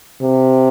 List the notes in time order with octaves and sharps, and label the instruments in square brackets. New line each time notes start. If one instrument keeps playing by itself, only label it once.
[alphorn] C3